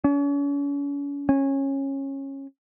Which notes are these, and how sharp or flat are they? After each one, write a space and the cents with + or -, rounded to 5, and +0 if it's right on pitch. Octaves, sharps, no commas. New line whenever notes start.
C#4 +40
C#4 -20